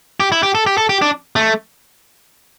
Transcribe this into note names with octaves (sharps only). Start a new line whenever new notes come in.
G4
E4
G4
A4
G4
A4
G4
D4
A3